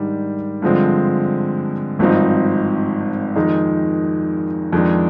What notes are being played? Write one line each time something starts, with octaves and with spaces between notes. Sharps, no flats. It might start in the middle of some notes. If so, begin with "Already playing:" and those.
Already playing: G#2 D#3 G3 D4
G2 D3 F3 G#3 C4
G#1 G2 F3 C4 D#4
F2 D#3 G#3 D#4
F2 D#3 G#3 D4